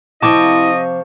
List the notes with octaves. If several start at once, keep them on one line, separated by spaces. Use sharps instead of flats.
C3 F3 C4 E4 D#5 A5 C#6 D6